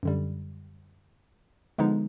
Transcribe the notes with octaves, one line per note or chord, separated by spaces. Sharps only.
F#2 D3 G3
D3 F3 G#3 B3 D#4